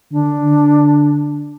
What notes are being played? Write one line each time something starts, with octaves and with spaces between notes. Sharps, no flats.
D3 D4
D3